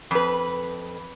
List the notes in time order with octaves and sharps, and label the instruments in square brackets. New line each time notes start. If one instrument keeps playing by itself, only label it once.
[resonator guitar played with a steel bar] F2 B4